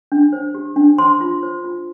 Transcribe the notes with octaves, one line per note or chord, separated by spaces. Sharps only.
D4
C5
G4
D4
C5 C6
F4
C5
F4